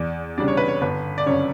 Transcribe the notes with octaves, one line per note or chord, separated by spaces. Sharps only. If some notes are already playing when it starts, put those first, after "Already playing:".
Already playing: E2 D5
C#3 G3 D4 D5
C#5
B4
C#5
G1 B4
D5
F#2 C#3 C#5